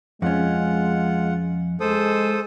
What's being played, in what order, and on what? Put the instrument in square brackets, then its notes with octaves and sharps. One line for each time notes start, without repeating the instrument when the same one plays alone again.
[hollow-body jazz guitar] F2 C#4 [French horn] G#3 [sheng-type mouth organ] F4 F#5
[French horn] G#3 [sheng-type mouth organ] A4 C5 D#6